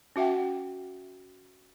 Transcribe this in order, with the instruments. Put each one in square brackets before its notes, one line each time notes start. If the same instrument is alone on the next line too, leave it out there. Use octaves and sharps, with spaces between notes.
[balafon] C#4 F#4 E5 F#5 G5